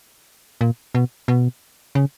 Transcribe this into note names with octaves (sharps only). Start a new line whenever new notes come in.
A#2
B2
B2
C#3